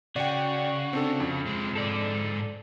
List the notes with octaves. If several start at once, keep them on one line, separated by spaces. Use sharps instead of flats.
C#3 F#4 D5 G5
C4 D4 A4
F2
C3 G#3
G#2 A4 D5